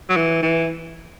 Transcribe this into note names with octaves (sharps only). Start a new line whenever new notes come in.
F#3
E3
E3